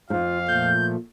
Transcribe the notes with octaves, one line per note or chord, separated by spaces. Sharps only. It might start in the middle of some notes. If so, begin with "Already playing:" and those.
F2 G#2 F4 F5
A#2 F3 A3 G6